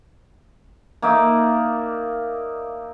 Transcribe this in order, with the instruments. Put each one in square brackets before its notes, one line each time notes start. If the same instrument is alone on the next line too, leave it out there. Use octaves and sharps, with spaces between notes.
[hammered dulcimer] A#3 D#4 D5 E5